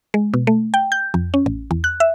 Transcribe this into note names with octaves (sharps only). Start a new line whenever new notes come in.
G#3
B2
A3
G5
G6
F2
C#4
A1
E2
F#6
E5